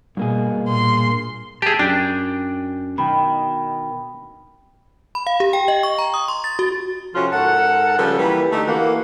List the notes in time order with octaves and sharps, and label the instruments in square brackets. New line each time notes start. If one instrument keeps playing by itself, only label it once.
[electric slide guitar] G2 A#3 G#4 [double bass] B2
[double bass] A#2 [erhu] C6
[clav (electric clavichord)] G4 G#4 [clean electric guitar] E5 A5
[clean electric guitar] F#2 G5 [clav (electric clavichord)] D4
[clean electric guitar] B2 D#3 [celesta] G5 B5
[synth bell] B5
F5
G4
G5
D#5
C#6
A#5
D#6
C6
A6
F#4
[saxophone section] C3 F3 C#4 F4 F#4 A4
G#2 A4 A#4 F#5
C#3 F3 G3 A4 B4
E3 G3 A#3 B4
D3 A3 D#4 G4 A4
E3 A#3 F#4